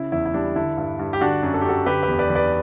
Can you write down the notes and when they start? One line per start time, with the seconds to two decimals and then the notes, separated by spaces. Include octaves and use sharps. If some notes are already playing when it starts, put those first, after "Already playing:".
Already playing: C#3 E4
0.12 E2 E4
0.25 E4
0.34 G3 D4
0.56 D3 E4
0.77 G2
0.99 G2
1.13 G4
1.21 D3 D4 F#4
1.43 F#2
1.54 A4
1.61 G4
1.65 F#2 F#4 A4
1.86 D3 G4 B4
2.03 G4 B4
2.08 E2
2.19 B4 D5
2.30 E2
2.35 B4 D5